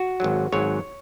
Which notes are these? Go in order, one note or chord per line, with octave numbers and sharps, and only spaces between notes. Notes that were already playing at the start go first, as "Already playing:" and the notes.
Already playing: F#4
G#1 G#2 F#3
G#1 G#2 F#3 C#5